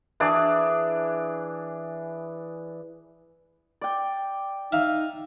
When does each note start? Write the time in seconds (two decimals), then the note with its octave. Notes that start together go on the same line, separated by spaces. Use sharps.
0.20 E3 D4 G#4
3.81 D5 G5
4.72 D#4 E5 F5